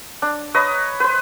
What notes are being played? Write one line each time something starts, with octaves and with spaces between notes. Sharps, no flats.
D4
B4 C#5 D#5 A#5
B4 C5